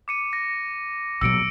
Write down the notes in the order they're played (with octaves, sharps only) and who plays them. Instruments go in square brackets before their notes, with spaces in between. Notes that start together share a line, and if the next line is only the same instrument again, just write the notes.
[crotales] D6 C#7 D#7
A#6
[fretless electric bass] A#1 B2 F#3 [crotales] E6 C#7 D7